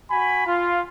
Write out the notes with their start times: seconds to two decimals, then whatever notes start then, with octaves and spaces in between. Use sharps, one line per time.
0.10 F#4 G#5 B5
0.46 F4